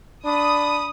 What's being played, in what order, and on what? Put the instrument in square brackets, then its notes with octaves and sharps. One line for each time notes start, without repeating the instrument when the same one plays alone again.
[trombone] D4 [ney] B5 [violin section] D#6